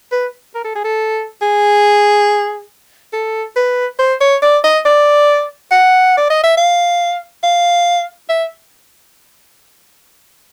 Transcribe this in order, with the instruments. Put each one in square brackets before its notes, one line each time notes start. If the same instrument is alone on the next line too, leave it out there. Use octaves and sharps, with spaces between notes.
[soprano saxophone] B4
A#4
A4
G#4
A4
G#4
A4
B4
C5
C#5
D5
D#5
D5
F#5
D5
D#5
E5
F5
F5
E5